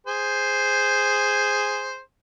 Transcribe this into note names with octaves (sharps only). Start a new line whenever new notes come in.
G#4 C5